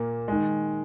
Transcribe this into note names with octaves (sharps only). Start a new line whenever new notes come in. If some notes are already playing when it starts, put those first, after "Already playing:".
Already playing: A#2 A#3
D#3 G#3